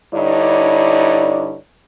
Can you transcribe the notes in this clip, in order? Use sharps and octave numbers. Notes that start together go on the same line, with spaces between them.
G2 D3 D#4 E4 C#5 D5